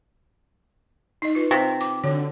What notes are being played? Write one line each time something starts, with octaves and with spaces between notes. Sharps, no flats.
D#4 D#5
F4 B4
C3
D6
D3 F#4 C#5